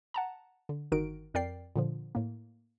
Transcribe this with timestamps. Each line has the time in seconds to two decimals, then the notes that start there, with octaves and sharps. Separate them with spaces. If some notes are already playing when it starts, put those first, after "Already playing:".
0.14 F#5 A5 A#5
0.69 D3
0.92 G1 D#3 D#4 F#4 A#4 D7
1.34 F2 A#4 D5 G5 C7
1.76 A#2 D3 F3
2.15 A2 A#3